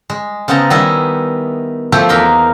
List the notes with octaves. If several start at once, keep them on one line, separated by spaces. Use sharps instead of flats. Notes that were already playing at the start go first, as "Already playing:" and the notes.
G#3
C#3 B3 C4 D#5 A5 A#5
D#3 G3 B3 E4 G#4 D#5
F3 A3 C4 E4 G4 C5
E2 A#3 D#4 A#4 B5 C6